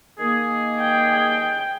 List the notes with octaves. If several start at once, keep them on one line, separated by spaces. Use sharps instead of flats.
D#3 A#3 G#4
G5